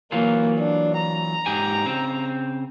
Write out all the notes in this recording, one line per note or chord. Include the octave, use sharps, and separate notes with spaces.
E3 F#3 A#3 F4
D4
A#5
G#2 G4 G#5
C#3 C4